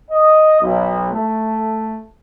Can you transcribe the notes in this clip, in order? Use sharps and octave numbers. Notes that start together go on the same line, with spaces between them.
D#5
B1
A3